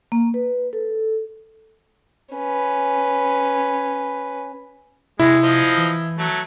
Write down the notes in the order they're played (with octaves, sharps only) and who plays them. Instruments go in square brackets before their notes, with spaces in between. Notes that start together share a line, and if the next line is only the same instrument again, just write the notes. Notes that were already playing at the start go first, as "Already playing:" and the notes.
[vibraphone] A#3
B4
A4
[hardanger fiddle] C#4 B4
[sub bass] C3 [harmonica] G#3 [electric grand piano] E4
[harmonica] F3 D#4 C5
[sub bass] E3
[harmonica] F#3 A3